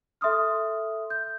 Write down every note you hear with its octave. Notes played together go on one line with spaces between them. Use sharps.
A4 E5 C6 D#6 F6
G6